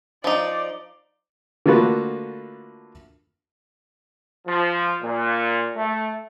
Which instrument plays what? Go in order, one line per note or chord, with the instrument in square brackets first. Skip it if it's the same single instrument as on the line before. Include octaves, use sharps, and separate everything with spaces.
[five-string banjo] F3 D#4 [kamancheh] D5
[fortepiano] D3 A3 A#3 F4 F#4 B4
[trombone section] F3
A#2
A3